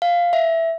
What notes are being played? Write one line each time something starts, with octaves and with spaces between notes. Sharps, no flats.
F5
E5